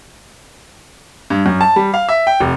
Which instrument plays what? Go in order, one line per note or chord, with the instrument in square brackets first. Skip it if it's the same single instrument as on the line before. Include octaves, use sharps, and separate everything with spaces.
[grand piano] G2
F#2
A5
G3
F5
E5
G5
F1